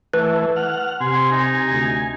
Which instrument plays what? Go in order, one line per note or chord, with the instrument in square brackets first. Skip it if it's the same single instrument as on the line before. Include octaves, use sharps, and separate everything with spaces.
[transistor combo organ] E3 A3 [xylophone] B4
[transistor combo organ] F#5 F6
[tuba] C3 [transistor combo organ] G#5 [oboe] C6
[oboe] D#4
[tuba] D2